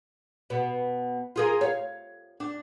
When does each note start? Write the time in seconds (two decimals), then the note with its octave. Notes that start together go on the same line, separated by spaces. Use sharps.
0.50 B2
1.36 F4 G#4 A#4
1.61 C#5 F5
2.40 D4